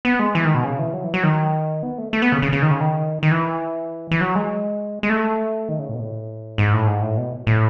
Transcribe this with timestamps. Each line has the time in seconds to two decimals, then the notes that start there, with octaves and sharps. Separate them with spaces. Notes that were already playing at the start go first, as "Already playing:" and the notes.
0.05 B3
0.19 G#3
0.35 E3
0.45 D#3
0.55 B2
0.64 C#3
0.79 E3
0.94 F#3
1.04 E3
1.14 F#3
1.23 D#3
1.83 B3
1.98 A3
2.13 A3
2.22 B3
2.32 C#3
2.42 C#3
2.53 C#3
2.62 D#3
2.71 C#3
2.80 D#3
3.23 D#3
3.31 E3
4.11 E3
4.21 F#3
4.35 G#3
5.03 G#3
5.10 A3
5.69 D#3
5.79 C#3
5.89 A2
5.95 B2
5.99 A2
6.58 G#2
6.73 A2
6.87 G#2
7.02 A2
7.17 B2
7.47 A2